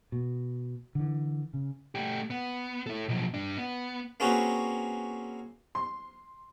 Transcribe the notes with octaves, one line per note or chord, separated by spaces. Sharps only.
B2
D3 E3
C#3
A3 G4
B3
E4 A4
B1 F3
G2 D4
B3
A#3 C4 C#4 F#4 G#4 B4
C6